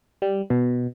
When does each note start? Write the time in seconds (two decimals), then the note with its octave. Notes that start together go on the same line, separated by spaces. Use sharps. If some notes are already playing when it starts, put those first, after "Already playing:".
0.22 G3
0.50 B2